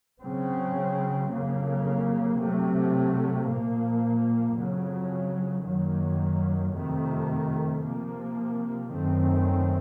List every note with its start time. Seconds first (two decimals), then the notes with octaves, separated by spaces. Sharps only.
0.22 C#3 F#3 C4
1.31 F2 C#3 F#3 A#3
2.39 C3 F#3 A3
3.47 A#2 F3 A#3
4.57 F2 C#3 F#3
5.65 F#2 D#3 F#3 A#3
6.73 F2 C3 D#3 A3
7.82 C3 F3 A#3
8.90 F#2 D#3 A3 C4